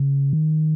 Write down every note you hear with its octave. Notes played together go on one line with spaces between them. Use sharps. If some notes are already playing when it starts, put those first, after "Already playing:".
Already playing: C#3
D#3